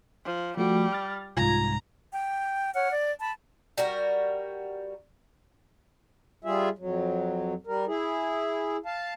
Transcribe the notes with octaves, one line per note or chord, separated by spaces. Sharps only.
F3
F3 G3 A3 F#4
F6 A6
C2 G#2 F4 A#5 G#6 A#6
G5
C#5 F#5 F6
D5
A5 B5
G3 F#4 A#4
G3 F4 G#4 E5
F2 F#3
G3 A#4
E4 G#4
F5 A5